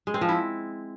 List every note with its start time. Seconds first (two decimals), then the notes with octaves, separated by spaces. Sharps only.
0.07 G#3
0.14 C4
0.21 F3
0.29 E4